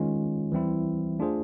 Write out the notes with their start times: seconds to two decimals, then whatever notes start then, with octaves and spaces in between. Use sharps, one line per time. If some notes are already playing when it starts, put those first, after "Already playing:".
Already playing: D#3 G#3 C#4 F4
0.52 E3 G3 C4 E4
1.19 A3 D4 F4 G#4 C5